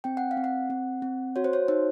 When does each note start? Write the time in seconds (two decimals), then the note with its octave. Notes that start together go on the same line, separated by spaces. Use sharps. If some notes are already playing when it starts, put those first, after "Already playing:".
0.04 C4 G5
0.17 F#5
0.31 F5
0.37 C4
0.44 F#5
0.70 C4
1.02 C4
1.36 F#4 C#5
1.44 C5
1.53 C#5
1.68 D#4 C5